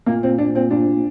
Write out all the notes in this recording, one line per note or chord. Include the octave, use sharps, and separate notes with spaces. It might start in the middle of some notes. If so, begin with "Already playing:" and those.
A#2 A#3
A#2 C4
A#2 D4
A#2 C4
A#2 D4
A#2